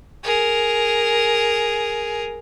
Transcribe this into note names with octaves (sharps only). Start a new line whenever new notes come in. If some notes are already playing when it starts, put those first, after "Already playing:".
G#4 A#4